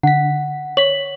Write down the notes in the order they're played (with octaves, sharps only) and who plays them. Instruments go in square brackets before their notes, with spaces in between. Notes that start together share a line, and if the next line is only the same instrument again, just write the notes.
[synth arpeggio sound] D3 B6 [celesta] F#5
[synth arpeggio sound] C#5 B6 [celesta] F#7